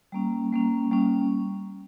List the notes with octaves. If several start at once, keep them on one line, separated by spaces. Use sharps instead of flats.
G3 A#3 C#4
G3 A#3 C#4
G3 A#3 C#4